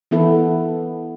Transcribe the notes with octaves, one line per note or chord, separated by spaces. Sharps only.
E3 B3 E4 A4